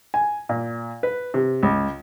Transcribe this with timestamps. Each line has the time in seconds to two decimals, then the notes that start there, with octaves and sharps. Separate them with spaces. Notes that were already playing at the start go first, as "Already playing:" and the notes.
0.14 G#5
0.49 A#2
1.03 B4
1.34 C3
1.63 C#2